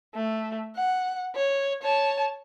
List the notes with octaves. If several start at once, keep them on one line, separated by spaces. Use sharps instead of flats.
A3
F#5
C#5
C#5 A5